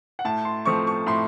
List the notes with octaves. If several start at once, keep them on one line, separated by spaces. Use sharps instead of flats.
F#5
A2 A5
C6
F3 A3 C4 C#6
C#6
A2 C6